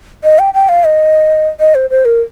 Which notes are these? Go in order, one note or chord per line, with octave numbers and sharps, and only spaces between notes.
D#5
G5
G5
F5
D#5
D#5
C5
C5
A#4